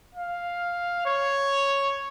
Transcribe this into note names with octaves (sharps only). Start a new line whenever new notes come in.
F5
C#5